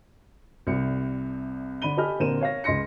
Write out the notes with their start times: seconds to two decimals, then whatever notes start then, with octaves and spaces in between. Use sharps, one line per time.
0.67 C2 C3 G3 C#7
1.82 D3 D5 B5 D#7 G7
1.97 G4 A4 D#5 G#5 B5 F6
2.19 A#2 D3 C4 A#4 D#7 E7
2.41 C#5 F5 A#6
2.64 C#2 D#5 C6 A#6 C#7